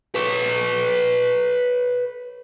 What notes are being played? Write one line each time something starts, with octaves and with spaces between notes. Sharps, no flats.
B4 C#5